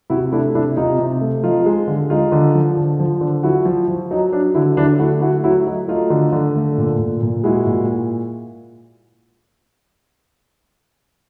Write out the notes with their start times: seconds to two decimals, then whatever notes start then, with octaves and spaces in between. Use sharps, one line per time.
0.10 C3 E4 F#4
0.32 A3 D4 E4
0.55 C3 D4 E4
0.77 C3 D#4 F4
0.99 C3
1.21 A3
1.44 F3 D#4 F4
1.66 G#3
1.88 D3
2.10 G#3 D#4 F4
2.32 D3
2.55 F3
2.77 D3
3.00 F3
3.21 D3
3.43 F3 E4 F#4
3.65 F3
3.88 F3
4.11 F#3 D#4
4.32 F#3 D4
4.54 D3 D4 E4
4.77 D3 D4 E4
4.99 A3 E4 F#4
5.21 A3 E4 F#4
5.44 F#3 E4 F#4
5.67 F#3 D#4
5.88 A3 D#4 F4
6.10 D3
6.32 D3
6.56 A3
6.78 A#2
6.99 A#2
7.23 A#2
7.44 G#3 E4 F#4
7.67 A#2